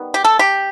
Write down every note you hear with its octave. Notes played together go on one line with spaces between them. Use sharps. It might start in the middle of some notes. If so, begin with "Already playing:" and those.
Already playing: D#3 G3 B3
G4
A4
G4